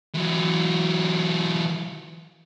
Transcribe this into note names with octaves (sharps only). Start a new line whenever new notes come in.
E3 F#3